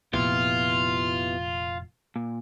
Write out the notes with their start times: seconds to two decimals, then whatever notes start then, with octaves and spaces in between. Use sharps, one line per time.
0.13 F1 F2 A#2 B3 E4 F4 G4
2.16 A#2